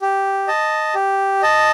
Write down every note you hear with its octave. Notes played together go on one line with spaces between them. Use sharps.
G4
D#5 A5
G4
D#5 A5